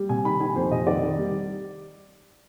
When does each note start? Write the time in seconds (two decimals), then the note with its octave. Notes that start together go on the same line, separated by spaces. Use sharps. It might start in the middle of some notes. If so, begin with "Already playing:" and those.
Already playing: G3
0.09 C3 G#5
0.25 D#3 B5
0.40 D#3 G#5
0.56 F2 C5
0.71 C3 D#5
0.87 D#3 D5
1.02 D#3
1.18 G3